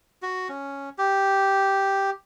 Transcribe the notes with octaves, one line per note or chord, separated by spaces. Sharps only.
F#4
C#4
G4